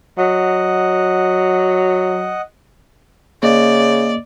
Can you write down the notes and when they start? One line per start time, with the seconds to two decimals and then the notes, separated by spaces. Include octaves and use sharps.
0.18 F#3 D#5 F#5
3.43 C#3 A#3 D5 D#5